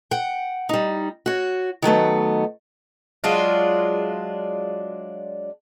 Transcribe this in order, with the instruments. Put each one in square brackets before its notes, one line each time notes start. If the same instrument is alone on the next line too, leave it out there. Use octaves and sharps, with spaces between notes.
[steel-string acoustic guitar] F#5 G5
G3 D#4
F#4 C#5
D#3 F#3 A3 B3
[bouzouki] F#3 G#3 D4 F4